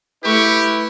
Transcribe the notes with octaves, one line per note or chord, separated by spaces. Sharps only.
A3 E4 G4 B4 C#6